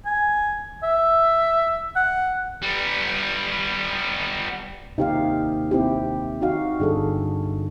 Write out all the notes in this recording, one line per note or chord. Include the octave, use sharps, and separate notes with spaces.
G#5
E5
F#5
G3 B3
D#2 C3 D#4 G4 F5
C4 E4 G4
D#4 F#4 F5
G1 D4 G#4 A4